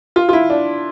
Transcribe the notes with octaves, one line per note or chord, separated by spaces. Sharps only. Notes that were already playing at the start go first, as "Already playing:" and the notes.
F4
F4
E4
D4